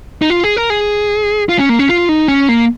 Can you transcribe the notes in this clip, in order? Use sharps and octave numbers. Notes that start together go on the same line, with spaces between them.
D#4
F4
G#4
A#4
G#4
F4
C#4
A#3
C#4
F4
D#4
C#4
A#3